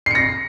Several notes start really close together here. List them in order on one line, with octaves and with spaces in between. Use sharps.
C7 C#7 A#6